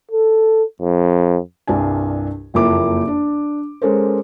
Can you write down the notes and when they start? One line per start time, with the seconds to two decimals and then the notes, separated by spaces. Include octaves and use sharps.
0.11 A4
0.82 F2
1.67 C2 G2 D4 G#5
2.54 F#1 F2 A#3 E4 D6
3.07 D4
3.82 G#3 C#4 A4 A#4 C5